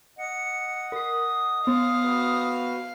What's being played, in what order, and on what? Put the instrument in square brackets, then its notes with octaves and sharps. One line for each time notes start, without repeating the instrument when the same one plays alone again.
[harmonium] D#5 F#5 [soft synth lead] C#7
[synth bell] A#4 C7 [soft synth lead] D#6
[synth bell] B3 [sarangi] F5
[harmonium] F#4 B4